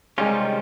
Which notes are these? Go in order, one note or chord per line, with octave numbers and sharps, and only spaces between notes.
C3 D#3 G3 G#3 C#4 F4